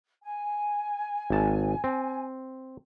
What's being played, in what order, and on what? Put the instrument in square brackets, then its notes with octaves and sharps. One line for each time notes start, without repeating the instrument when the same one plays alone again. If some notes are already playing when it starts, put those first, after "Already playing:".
[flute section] G#5
[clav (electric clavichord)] G#1 A5
C4